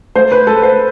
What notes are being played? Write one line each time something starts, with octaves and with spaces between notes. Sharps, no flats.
A3 C5
B4
A3 A4
C5